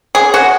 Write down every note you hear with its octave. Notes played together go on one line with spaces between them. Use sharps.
G#4
F#4